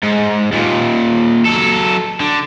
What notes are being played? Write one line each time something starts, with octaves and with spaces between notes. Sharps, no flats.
G#2
D#2 A#2
F#3 A4
D3